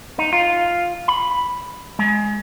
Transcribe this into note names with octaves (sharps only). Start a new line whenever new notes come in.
D#4
F4
B5
G#3